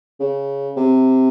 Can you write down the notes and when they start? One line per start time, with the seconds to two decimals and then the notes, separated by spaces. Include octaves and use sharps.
0.20 C#3
0.76 C3